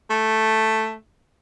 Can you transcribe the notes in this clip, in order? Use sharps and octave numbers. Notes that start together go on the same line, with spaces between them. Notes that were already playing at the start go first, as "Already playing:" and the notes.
A3